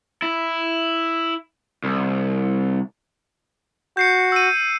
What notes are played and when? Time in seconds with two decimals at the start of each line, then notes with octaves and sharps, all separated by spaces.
0.22 E4
1.84 C2
3.97 F#4 G6 C7 C#7
4.32 E6 D#7